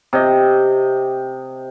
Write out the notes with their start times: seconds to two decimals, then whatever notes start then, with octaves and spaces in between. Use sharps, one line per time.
0.13 C3 D#5